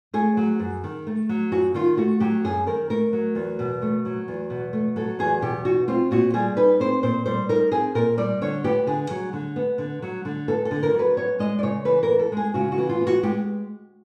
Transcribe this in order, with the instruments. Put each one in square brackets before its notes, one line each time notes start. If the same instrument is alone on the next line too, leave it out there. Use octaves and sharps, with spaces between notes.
[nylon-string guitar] A3 G#4
F#3
F#2
D#3
A3
F#3
F#2 F#4
D#3 F4
A3 F#4
F#3 G4
F#2 G#4
D#3 A#4
A3 A#4
F#3
E2
B2
A3
F#3
E2
B2
A3
F#3 A4
E2 G#4
B2 G4
D#4 F#4
C4 F4
A#2 F#4
G3 G#4
D#4 B4
C4 C5
A#2 C5
G3 C5
D#4 A#4
C4 G#4
A#2 A#4
G3 D5
D3 C#5
B3 G4
D3 G#4
F#3
D3
B3
D3
F#3
D3
B3 A4
A4
D3
A#4
F#3
B4
B3 C#5
G#3 D#5
D5
C#3 C#5
E3 B4
A#4
B3
A4
G#3 G#4
C#3 F#4
F#4
E3
F4
B3
F#4
G#3 G4